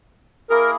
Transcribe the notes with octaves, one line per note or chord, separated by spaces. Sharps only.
A#3 E4 G#4 A#4